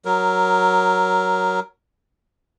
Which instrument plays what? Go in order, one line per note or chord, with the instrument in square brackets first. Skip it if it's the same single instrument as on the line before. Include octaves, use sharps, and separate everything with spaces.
[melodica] F#3 A#4